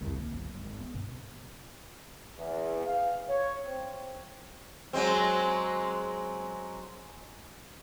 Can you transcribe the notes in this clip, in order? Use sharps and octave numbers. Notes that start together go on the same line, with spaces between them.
C2 F2
D#2 A#3
G1 F#3
G#1
B3
G2 B2
E2
F5
C#5
C4
F#3 G#3 C4